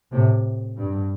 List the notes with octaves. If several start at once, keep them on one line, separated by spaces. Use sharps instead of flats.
A2 C3
G2